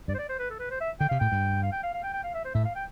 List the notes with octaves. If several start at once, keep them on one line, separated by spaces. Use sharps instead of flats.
G2 D5
C5
D5
C5
B4
A4
B4
C5
E5
D3 G5
C3 F5
A2 G5
G2
F5
G5
F5
F5
G5
G5
F5
E5
C5
A2 E5
F5
G5